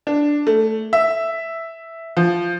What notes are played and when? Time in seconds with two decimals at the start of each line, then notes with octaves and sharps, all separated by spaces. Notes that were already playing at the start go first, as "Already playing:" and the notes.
0.07 D4
0.47 A3
0.93 E5
2.17 F3